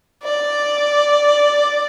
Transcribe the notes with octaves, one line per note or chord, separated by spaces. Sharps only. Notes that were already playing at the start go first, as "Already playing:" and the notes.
D5